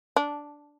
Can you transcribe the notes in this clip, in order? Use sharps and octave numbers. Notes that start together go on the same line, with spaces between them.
D4